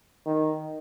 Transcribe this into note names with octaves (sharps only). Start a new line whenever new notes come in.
D#3